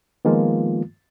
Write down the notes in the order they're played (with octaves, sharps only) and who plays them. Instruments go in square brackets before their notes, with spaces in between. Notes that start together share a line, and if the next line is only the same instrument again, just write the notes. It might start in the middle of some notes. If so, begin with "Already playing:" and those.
[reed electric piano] D#3 F3 G#3 A#3 B3 F4